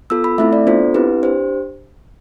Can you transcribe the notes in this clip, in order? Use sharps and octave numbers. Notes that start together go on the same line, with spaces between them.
B3 F4 A4 E6
B5
A3 C4 E4 A4 E5
D5
B3 D4 F4 A4 C5
C4 E4 G4 B4
D4 G4 C5